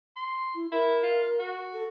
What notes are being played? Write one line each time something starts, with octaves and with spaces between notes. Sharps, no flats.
C6
E4
E4 A#4
F4
F#4
A4